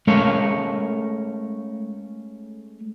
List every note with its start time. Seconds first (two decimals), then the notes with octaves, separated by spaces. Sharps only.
0.07 G#3 A3 C#4 A#4 C#5 F5